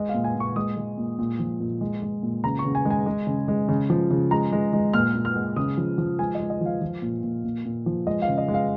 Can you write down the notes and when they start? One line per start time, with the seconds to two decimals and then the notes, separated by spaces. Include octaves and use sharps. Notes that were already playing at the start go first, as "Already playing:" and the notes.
Already playing: G#3 D#5
0.09 A#2 F5
0.24 G#5
0.35 A#2
0.40 C#6
0.56 G#3 D#6
0.77 G#3
0.98 A#2
1.18 A#2
1.39 F3
1.60 A#2
1.81 G#3
2.02 G#3
2.23 A#2
2.44 C#3 A#5
2.59 C#6
2.65 C#3
2.75 G#5
2.85 G#3
2.90 G#5
3.06 G#3
3.27 C#3
3.48 G#3
3.69 C#3
3.90 F3
4.11 C#3
4.31 G#3 A#5
4.52 G#3
4.73 G#3
4.93 A#2 F6
5.15 A#2
5.25 F6
5.36 G#3
5.56 C#3 D#6
5.77 F3
5.98 F3
6.19 G#3 G#5
6.35 D#5
6.40 G#3
6.50 D#5
6.61 F3 F5
6.81 F3
7.02 A#2
7.23 A#2
7.44 A#2
7.65 A#2
7.86 F3
8.07 G#3 D#5
8.22 F5
8.28 C#3
8.38 D#5
8.48 G#3
8.54 F5